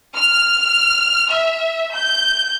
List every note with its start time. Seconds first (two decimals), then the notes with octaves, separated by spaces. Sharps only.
0.15 F6
1.30 E5
1.94 G6